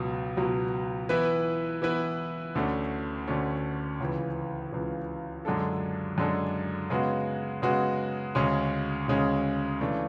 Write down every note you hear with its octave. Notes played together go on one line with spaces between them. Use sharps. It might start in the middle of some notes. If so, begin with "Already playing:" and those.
Already playing: C#2 B2 F#3
C#2 B2 F#3
E3 B3 E4 B4
E3 B3 E4 B4
D2 D3 A3 C#4
D2 D3 A3 C#4
C#2 C#3 E3
C#2 C#3 E3
F#2 D3 G#3 D4 A4
F#2 D3 G#3 D4 A4
C#3 G#3 B3 F#4
C#3 G#3 B3 F#4
D2 C#3 G#3 C#4
D2 C#3 G#3 C#4
C#3 E3 A3 D4